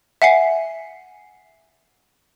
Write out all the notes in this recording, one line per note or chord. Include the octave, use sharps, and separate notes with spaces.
E5 F#5 G#5 C7